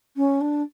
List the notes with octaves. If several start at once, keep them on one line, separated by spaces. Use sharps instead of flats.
C#4
D4